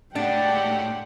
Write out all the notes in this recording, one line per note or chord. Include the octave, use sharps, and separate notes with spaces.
A2 G#3 D4 G4 F#5 G5